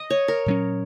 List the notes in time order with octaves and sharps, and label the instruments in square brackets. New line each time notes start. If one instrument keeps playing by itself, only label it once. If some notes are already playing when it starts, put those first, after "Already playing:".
Already playing: [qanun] D#5
C#5
A#4
[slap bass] A#2 F#3 C#4